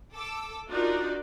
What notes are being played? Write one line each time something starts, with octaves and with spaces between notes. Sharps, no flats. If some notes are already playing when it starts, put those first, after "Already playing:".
A4 D6 E6
D4 D#4 F4 F#4 A#4 D5